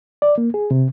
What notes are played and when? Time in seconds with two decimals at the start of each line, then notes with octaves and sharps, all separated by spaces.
0.22 D5
0.38 A#3
0.54 G#4
0.71 C3